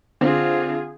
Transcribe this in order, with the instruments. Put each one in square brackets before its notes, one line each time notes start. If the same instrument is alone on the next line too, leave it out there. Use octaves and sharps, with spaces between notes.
[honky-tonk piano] D3 C4 [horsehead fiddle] F4 G#4